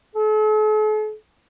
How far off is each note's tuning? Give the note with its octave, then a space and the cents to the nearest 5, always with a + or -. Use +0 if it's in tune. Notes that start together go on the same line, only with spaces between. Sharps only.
A4 -45